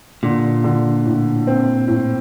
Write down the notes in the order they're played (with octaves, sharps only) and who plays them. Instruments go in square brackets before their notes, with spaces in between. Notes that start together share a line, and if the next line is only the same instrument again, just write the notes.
[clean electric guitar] A#2 [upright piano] D3
[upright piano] D3
A2
C4
A2